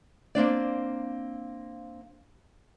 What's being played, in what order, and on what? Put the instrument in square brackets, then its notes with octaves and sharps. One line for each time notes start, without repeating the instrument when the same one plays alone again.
[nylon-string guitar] A#3 C4 D4 D5